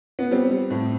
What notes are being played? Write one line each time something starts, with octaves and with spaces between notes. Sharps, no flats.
B3
G3 C4
G3
A2